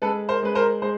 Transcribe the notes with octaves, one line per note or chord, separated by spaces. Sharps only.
G#3 A4 B4
A#4 C5
G#3 B4
A#4 C5
G#3 C5